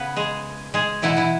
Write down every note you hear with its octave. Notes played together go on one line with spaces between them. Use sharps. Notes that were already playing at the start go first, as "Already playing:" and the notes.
Already playing: C#3 B3 B4
G#3 G#4
G#3 G#4
B2 E3 F#3 E4
E3 E4